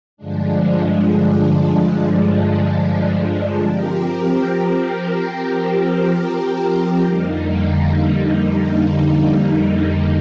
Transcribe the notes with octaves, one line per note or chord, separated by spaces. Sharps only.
G2 D3 F3 G#3 D4
F3 C4 G4 A#4
F2 D3 G3 A#3 D#4